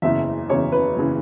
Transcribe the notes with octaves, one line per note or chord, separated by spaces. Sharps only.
F#1 E2 C#3 E3 E5
F#1 E2 C#3 E3 C#5
B4
F#1 C#3 E3